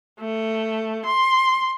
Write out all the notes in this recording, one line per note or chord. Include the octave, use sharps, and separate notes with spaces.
A3
C6